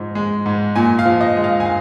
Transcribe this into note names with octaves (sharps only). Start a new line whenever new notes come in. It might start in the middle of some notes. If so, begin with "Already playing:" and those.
Already playing: G#2 F3 G#3
G#3
G#2
A#2 G#5
F5
F3
D#5
G#3
F5
G#5
F5